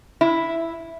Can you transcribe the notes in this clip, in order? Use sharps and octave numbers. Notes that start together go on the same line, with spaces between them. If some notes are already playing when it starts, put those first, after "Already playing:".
E4